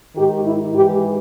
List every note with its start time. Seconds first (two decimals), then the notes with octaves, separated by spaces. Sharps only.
0.16 G#2 D#3 G4
0.44 E4
0.74 G#2 E3 G4